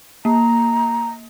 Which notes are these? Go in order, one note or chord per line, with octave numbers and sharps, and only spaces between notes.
A#3 A#5